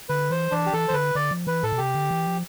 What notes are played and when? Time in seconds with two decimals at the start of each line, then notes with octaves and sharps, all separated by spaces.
0.09 D3 B4
0.30 E3 C5
0.51 E3 D4
0.66 G4
0.73 E3 A4
0.88 E3 C5
0.93 D3 B4
1.15 D3 D5
1.31 F3
1.47 E3 B4
1.63 A2 A4
1.72 B2
1.78 C3 G4
1.94 D3
2.11 E3
2.26 F3